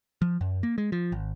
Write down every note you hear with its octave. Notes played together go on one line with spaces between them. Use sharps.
F3
F#2
A#3
G#3
F3
G#1